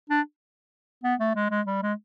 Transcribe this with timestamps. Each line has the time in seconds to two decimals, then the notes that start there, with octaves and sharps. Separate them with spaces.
0.09 D4
1.04 B3
1.20 A3
1.35 G#3
1.50 G#3
1.66 G3
1.82 G#3